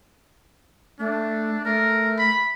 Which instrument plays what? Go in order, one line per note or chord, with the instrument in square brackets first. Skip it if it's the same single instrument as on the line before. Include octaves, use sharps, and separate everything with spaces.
[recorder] A3 [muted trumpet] D4
[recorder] A3 [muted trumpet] A#4
[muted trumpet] B5